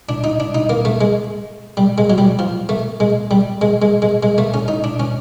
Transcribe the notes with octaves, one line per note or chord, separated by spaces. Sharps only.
D4
D#4
D4
D#4
A#3
A3
G#3
G3
G#3
F#3
G3
F3
A3
G#3
G3
G#3
G#3
G#3
G#3
A3
C#4
D#4
D4
C#4